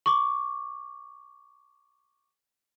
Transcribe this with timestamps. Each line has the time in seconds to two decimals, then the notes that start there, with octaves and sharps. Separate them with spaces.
0.06 C#6 D6